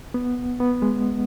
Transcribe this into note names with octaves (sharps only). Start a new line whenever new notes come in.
B3
B3
G#3